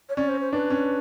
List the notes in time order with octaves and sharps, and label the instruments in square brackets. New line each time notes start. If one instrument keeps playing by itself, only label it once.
[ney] C#5
[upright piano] C#4 [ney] D5
[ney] C5
C5
[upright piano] D4 [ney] B4
[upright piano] C#4